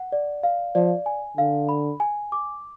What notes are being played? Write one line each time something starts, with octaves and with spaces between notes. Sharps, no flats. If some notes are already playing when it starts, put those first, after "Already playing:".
Already playing: F#5
D5
F5
F3 D5
G#5
D3 F5
B5
G#5
D6